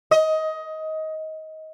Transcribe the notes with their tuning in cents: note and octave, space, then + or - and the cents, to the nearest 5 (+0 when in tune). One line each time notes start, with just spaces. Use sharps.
D#5 +20